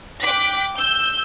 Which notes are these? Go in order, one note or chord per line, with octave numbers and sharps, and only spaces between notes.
G5 D6 F#6 B6
E6 G6